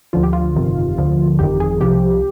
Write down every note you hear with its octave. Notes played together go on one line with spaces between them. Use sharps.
D2 D3 F3 F4
G4
F4
G1 F2 C3 D#3
D2 D3 F3
G1 F2 D#3 G4
G#4
C2 C3 F3 G4